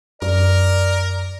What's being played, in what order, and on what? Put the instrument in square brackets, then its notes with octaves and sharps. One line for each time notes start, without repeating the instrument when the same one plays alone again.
[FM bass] F#2 [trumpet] A#4 [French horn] D5